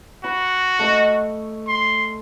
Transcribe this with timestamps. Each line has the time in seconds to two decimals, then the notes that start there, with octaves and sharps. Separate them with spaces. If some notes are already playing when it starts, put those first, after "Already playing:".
0.24 F#4 B5 C#6
0.79 A3 D#5 C#6
1.68 C6